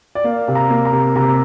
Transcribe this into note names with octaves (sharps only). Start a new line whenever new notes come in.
D5
A#3 F5
C3
A#5
A#3
A#5
C3
C3 A#5